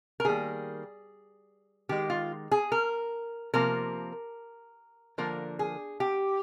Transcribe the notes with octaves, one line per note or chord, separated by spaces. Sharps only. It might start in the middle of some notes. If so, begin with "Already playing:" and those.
A#4
D#3 G3 A#3 G#4
D#3 G#3 G4
F4
G#4
A#4
C3 F3 A#3 A#4
D3 F3 A#3 A#4
G#4
G4